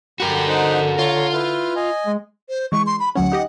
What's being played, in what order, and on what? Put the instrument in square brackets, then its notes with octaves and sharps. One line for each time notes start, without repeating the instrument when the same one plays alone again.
[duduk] D3 [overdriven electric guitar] F#4 A#4 [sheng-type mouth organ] G4 B5
[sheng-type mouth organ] D#4 C5 F#5
[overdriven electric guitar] F4 [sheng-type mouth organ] C#5 A#5
[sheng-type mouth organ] E4 B4 F6
D#5 G#5
[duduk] G#3
[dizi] C5
[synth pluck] E3 G#3 [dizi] C#6
[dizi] C6
B5
[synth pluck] D2 F#3 C#4 [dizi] F#5
[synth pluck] D#4 G4 D#5